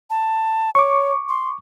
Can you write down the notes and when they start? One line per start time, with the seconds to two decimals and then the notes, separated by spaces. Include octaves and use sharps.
0.10 A5
0.75 C#5 C#6 D6
1.29 C6